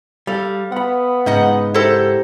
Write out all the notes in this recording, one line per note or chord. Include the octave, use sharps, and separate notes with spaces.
G3 A4 F5
B3 F#5 B5
G#2 C#3 D#4 D#5 F#5
E4 G4 A4 A#4 C5